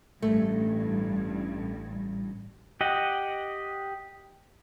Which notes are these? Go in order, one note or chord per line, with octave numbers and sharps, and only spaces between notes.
A1 G2 A3
G4 D#5 F#5